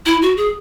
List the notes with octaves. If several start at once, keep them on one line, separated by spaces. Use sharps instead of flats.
E4
F#4
G#4